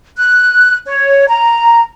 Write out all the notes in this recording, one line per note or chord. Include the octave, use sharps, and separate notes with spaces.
F#6
C#5
A#5